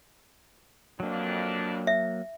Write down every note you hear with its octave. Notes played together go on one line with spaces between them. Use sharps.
F2 F#3 A#3 D4
E5